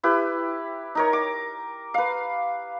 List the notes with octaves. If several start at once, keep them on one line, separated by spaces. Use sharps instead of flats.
E4 G4 B4
D#4 A#4 C#5
D6
B4 F5